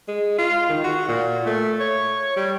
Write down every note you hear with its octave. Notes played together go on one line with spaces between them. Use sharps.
G#3
F4
D#3
F#4
A#2
A3
C#5
G3